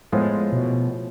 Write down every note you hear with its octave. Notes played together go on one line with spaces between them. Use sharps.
A2 F3 G#3 B3 F4 G#4
B2